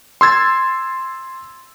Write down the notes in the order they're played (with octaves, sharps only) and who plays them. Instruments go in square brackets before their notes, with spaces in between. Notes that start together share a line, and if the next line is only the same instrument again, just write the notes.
[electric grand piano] C6 E6 G#6 A6